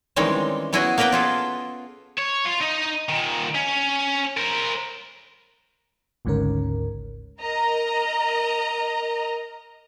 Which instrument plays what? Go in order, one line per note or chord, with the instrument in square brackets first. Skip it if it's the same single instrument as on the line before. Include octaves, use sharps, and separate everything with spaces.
[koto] D#3 E3 G3 G#3 C4 C#4
B3 C#4 E4 F#4 G#4 D#5
A#3 B3 A#4 B4 G5
F4 G#4 A4
[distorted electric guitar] C#5
F4
D#4 D#5
A#2 D#3
C#4
A#4 C5
[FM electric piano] G#1 D2 G#2 C#3 C#4 A#4
[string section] A#4 D#5 A#5